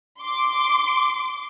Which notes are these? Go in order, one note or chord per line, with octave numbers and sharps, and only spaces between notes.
C6 D6